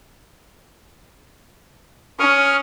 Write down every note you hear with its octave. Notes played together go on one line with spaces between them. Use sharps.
C#4 C#6 D#6 F6